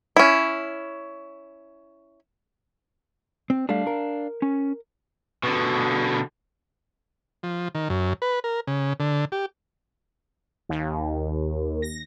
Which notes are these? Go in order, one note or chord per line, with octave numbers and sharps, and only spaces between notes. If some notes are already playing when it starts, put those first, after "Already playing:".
C#4 E4
C4
G3 A3 D4 F5
A#4
C#4
B2 D3
F3
D#3
F#2
B4
A#4
C#3
D3
G4
D#2
A#6